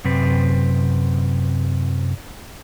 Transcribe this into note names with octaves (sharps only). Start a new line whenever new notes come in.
F#2 C3 C4 B4